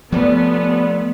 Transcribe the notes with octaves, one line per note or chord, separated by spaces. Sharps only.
F3 G3 A3 B3 C#4 D4